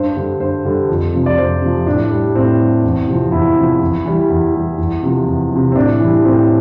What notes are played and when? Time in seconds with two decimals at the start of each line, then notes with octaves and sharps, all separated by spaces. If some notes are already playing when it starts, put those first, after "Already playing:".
Already playing: G2 C5
0.16 D3 G3
0.40 G2 C5
0.65 D3 G3
0.89 F2
1.14 C3 F3
1.26 D5
1.37 F2 C5
1.62 C3 F3
1.87 A2 D4
2.11 G3
2.35 A2 C4
2.60 G3
2.84 E2
3.08 C3 F3
3.32 E2 E4
3.57 C3 F3
3.81 E2
4.05 E3 G3
4.30 E2
4.54 E3 G3
4.78 E2
5.03 C3 F3
5.27 E2
5.52 C3 F3
5.72 C4
5.76 A2 D4
6.00 E3 G3
6.25 A2 C4